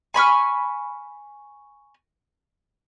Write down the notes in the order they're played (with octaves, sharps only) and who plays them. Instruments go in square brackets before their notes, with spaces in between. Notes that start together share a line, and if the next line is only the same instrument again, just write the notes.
[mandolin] G#5 B5 C#6 F6